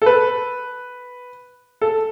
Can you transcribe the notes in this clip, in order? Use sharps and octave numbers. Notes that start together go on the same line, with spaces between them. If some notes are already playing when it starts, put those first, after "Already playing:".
A4
B4
A4